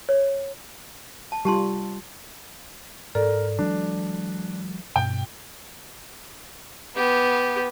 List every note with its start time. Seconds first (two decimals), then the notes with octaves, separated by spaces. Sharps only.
0.09 C#5
1.32 A5
1.45 G3 F4 G4 A5 C6
3.15 G#2 A4 A#4 D5
3.59 E3 F#3 G#3 D4
4.96 G2 B2 G5
6.96 B3 G4